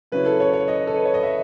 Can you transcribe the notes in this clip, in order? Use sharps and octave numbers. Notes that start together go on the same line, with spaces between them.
C#3 F#3 C#4 E4 B4
A4
C#5
C#5
D#5
A4
B4
C#5
D#5
E5